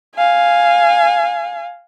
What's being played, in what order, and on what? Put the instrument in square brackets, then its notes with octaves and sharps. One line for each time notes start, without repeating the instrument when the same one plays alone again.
[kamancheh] F5 G#5